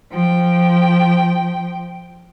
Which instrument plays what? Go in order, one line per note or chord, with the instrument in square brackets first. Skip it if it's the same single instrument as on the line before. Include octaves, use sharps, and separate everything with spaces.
[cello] F3 G5